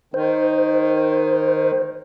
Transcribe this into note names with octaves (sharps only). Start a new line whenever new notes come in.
D#3 C5